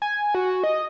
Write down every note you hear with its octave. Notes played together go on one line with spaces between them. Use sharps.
G#5
F#4
D#5